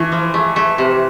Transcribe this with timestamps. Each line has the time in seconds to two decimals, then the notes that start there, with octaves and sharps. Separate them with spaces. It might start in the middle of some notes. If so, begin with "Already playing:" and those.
Already playing: E3 A3
0.12 F3
0.34 A3
0.56 A3
0.78 C3